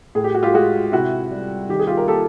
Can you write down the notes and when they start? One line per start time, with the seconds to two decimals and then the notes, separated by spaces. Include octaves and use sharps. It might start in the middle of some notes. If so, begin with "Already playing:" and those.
0.15 A2 G#4
0.24 G4
0.35 F#4
0.43 F4 G4
0.54 G#3 F#4 G#4
0.92 C3 E4 F#4
1.31 G3
1.69 D#3 G4
1.79 G#4
1.87 F4 G4
1.98 A#4
2.07 A#3 G4 A4